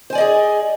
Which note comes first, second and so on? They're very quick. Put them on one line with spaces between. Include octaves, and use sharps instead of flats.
C5 G#5 D5 D#5 G#4